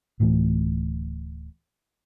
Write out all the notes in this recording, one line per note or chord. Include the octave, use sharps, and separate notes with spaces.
D1 A2 E3